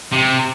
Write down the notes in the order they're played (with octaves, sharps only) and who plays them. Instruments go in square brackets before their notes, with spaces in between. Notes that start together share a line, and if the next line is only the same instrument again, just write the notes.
[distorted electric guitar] C3